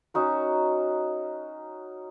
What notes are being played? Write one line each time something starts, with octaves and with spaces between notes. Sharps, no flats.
C#4 D#4 F#4 A#4